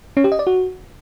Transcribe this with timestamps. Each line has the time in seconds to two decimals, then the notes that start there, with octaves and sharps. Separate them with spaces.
0.17 C#4
0.24 G4
0.32 D#5
0.39 D5
0.47 F#4